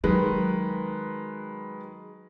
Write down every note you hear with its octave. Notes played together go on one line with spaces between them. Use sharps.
D#3 F#3 G#3 B4